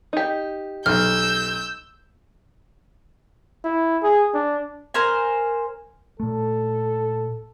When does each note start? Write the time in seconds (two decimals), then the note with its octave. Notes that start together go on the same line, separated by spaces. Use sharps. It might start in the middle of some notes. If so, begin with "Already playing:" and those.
0.13 D#4 G4
0.86 B1 E6 F6 G6
3.64 E4
4.03 G#4
4.34 D4
4.94 A#4 C5 G#5
6.20 A#2 A3 A4